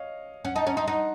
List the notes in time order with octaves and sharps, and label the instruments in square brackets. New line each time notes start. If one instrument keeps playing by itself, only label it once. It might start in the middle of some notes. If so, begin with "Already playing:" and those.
Already playing: [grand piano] C#5 D#5 F5
[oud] C#4 [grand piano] F#5
[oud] D#4 [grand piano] A5
[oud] C#4 [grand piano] A#5
[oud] D#4 [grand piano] C6
[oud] D#4 [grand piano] F#5